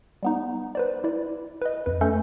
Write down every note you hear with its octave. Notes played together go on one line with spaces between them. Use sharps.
G3 B3 D#4
B4 C5 D5
E4 D5
B4 D#5
F2 B4
A3 C#4 A4 G6